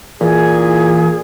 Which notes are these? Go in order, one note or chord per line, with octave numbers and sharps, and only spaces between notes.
A#2 E3 G#4